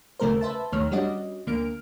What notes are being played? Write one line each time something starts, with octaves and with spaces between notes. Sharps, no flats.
D#2 C#3 A3 A#4 C5
B4 C5 E5 A5
D#2 D#3 A3 C#5 F6
G3 C#4 D4 F#4 D#5
D2 D3 A#3 F6 D7